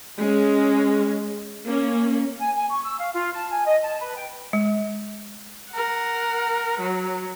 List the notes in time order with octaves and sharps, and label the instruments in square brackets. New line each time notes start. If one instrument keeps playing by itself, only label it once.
[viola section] G#3 C#4
A#3 C#4
[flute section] G#5
G#5
C#6
E6
F5
F4
A5
G#5
D#5
A5
B4
G5
[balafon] G#3
[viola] A#4 F#5
F#3